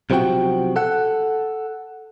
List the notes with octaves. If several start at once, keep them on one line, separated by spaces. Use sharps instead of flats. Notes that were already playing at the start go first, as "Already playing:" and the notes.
B1 C3 F3 A3 F#4 G5
A4 F#5